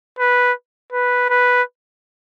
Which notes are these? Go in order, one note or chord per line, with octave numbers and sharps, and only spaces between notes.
B4
B4
B4